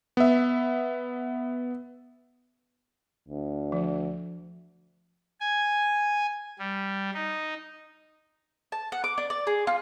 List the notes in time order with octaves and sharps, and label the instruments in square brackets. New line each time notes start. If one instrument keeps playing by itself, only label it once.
[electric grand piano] B3 E5
[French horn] D2
[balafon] F3
[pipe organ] G#5
G3
D#4
[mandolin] A5
F#5
D6
D4
D5
G#4
F4